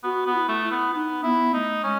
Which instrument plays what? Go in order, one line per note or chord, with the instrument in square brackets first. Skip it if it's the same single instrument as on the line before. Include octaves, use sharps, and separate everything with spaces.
[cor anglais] B3 [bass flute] F#4
[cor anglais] B3
[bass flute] E4
[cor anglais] A3
[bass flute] E4
[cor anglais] B3
[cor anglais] B3 [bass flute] D#4
[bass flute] B3 [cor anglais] E4
[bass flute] A3 [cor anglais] D#4
[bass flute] G#3 [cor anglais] C#4